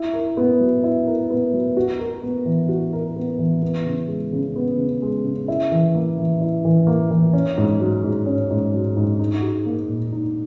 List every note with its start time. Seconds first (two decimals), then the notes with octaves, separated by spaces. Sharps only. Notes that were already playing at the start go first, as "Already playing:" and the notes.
Already playing: E4
0.13 A#4
0.37 B3
0.60 F#3
0.84 E4
1.07 A#4
1.30 B3
1.53 F#3
1.77 F#4
1.99 A#4
2.23 B3
2.46 E3
2.69 F#4
2.93 A#4
3.16 B3
3.39 E3
3.62 B3
3.86 C#3
4.08 G#3
4.32 C#3
4.56 B3
4.78 C#3
5.02 G#3
5.25 C#3
5.48 E4
5.72 E3
5.95 A#3
6.18 E3
6.41 E4
6.65 E3
6.87 A#3
7.11 E3
7.33 C#4
7.58 G#2
7.80 F#3
8.04 G#2
8.26 C#4
8.51 G#2
8.74 F#3
8.97 G#2
9.20 D#4
9.42 F#4
9.66 A#3
9.89 A#2
10.12 D#4